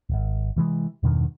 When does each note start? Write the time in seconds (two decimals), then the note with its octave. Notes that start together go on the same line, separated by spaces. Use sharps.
0.10 D1 G#1
0.56 C3 E3 F#3 G#3
1.03 E2 G2 B2 D#3